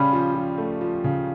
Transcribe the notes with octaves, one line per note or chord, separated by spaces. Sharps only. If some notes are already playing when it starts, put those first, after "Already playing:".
Already playing: C#3 G3 C#4
F3
F3
A3
F3
C#3